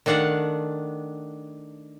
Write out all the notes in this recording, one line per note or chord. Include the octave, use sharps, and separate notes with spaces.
D#3 A3 D4 F5 F#5